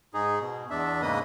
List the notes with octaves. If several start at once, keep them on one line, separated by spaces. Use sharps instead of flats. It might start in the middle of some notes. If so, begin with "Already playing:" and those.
G#2 D#4 G#4
B2
E2 D4 E5
G#2 C#3 A#3 B4 D#5 D#6